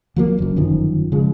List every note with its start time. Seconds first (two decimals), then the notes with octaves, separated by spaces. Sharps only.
0.16 F3 F#3 A#3
0.38 F#1 F#2
0.56 G1 F#2 D#3 F3
1.12 C#3 F3 G#3